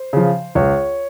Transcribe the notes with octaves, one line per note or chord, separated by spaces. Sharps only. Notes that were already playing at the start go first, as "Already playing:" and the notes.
Already playing: C5
C#3 F3
C#2 C#5